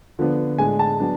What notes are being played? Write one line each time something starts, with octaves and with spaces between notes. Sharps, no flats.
D3 F3 B3 D4
A2 G#3 D4 G#5
A5
F#3 B3 D4